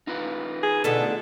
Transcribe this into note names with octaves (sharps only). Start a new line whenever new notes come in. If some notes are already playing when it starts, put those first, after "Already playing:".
D#4 F4 B4
G#4
B2 D3 A3 A4